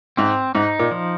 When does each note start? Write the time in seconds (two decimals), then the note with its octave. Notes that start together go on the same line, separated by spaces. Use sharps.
0.17 G#2 C4
0.55 G#2 D#4
0.79 A#2
0.91 F3